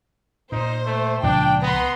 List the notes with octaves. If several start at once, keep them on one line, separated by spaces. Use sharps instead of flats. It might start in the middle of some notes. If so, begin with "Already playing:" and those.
A#2 D#4 C5
A3
C#2 A#2 F3 D4 G5
B3 B4 A#5 C6